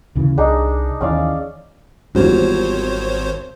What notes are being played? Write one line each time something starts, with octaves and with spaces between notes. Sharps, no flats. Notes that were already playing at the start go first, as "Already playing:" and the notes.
D2 C#3 E3
C2 D4 D#4 G#4
D#2 D#3 E3 C#4 D5 F5
G#1 E2 G#2 G3 F4 F#4 C5 C#5